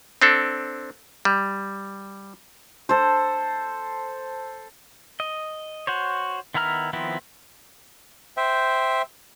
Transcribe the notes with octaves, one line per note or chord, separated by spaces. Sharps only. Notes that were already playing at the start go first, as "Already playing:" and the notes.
C4 D4 A4
G3
A4 C5
D#5
F#4 C5 C#5
D#3 B3 E4 A#5 F6
D#3 F3 B3 C4 E4
C5 E5 G5